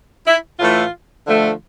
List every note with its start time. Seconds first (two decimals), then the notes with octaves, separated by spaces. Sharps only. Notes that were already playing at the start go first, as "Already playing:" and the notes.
0.27 E4
0.60 A2 E3 A3 F4
1.27 D3 F3 A3